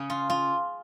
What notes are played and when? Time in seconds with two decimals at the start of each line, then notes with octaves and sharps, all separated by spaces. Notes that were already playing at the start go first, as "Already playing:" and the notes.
Already playing: C#3 C#4
0.10 F4
0.30 F4